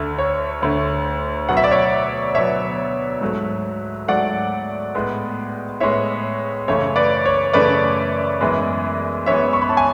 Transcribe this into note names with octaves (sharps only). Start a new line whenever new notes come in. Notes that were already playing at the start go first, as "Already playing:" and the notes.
Already playing: D2 D3 A3
C#5
D2 D3 A3
B2 F#3 B3 F#5
E5
D5
C#5 E5
B2 F#3 B3 C#5 E5
G#2 F#3 A3
G#2 F#3 A3 D5 F#5
A2 G#3 B3
A2 G#3 B3 C#5 E5
F#2 C#3 E3 A3 C#5
B4 D5
C#5
F#2 C#3 E3 A3 B4 D5
F#2 E3 G#3 B3
F#2 E3 G#3 B3 C#5 E5
C#6
B5
A5
G#5